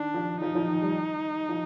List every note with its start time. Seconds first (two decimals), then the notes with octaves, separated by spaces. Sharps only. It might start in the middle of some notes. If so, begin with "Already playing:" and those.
Already playing: D#3 D4
0.14 F3
0.41 F3 D#4
0.55 F3
0.68 D#3
0.82 G3
1.49 F3